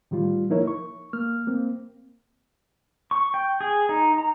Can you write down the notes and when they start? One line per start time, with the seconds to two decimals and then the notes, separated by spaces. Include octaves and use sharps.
0.11 A2 D#3 G3 F4
0.50 F3 A#3 D#4 E4 A#4 C#5
0.67 C#6
1.13 A#3 F6
1.47 A#3 C4
3.11 C#6
3.34 G5
3.61 G#4
3.89 D#4
4.18 A#5